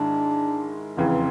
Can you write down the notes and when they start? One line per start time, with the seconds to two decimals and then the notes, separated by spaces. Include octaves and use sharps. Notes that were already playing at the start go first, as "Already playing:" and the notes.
Already playing: G#2 D#3 G#3 D4 E4
0.97 F1 E2 C#3 E3 C4